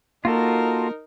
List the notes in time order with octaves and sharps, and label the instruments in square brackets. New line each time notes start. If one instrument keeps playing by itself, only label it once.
[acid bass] A#3 [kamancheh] D#4 A#4 [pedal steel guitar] F4 F#4 A4